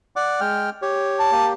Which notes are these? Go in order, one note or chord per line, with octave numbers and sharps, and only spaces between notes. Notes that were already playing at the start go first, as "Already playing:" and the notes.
D5 F#5 D6
G#3 G5 F6
G4 C#5
A5
A#3 G4